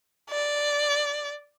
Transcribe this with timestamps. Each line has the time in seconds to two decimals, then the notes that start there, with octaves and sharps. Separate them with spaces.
0.31 D5